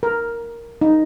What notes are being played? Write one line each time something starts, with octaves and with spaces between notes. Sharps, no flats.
A#4
D#4